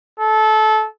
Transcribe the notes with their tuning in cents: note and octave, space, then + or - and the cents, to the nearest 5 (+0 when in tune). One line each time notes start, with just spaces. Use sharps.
A4 -20